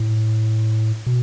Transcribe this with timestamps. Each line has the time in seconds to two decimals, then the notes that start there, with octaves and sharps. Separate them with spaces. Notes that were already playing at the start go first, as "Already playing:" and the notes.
Already playing: A2
1.07 B2